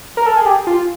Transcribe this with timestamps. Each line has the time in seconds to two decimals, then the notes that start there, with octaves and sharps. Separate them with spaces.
0.17 A#4
0.26 A4
0.37 G#4
0.46 G4
0.67 F4